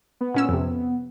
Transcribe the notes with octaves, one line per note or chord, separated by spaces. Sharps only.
B3
A#2 C#4 E6
F2 C3